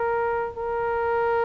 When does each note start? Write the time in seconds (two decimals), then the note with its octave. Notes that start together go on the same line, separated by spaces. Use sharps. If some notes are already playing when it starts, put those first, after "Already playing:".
Already playing: A#4
0.57 A#4